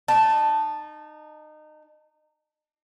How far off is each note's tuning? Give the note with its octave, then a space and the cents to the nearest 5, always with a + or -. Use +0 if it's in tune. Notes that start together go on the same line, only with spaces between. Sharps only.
D#4 -25 A5 +0